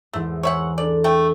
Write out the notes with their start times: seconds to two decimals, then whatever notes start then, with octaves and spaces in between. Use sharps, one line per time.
0.13 E2 G#2 A3 C5
0.43 A#4 C5 C#5 E5 F#5 G#5
0.78 D4 A4 D5
1.04 A3 G5